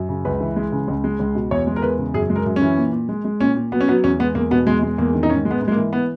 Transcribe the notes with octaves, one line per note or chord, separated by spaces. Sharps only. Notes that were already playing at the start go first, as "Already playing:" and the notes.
Already playing: F#2
C#3
C#2 B4
E3
G#3
C#3
C#2
G#3
C#2
B2
E2 C#5
G#3
A#4
E2 B4
C#3
F#2 G#4
G#3
A#4
F#2
C#4
E3
A#2
A#2
G#3
G#3
A#2 C#4
A#2
F#3 B3
C#4
F#3 B3
E2 C#4
G#3 B3
E2 A#3
B2 B3
E2 G#3
G#3
E2 A#3
D#3
D#4
G#2 C#4
G#3
B3
G#2
G#3
A#3
E3
B3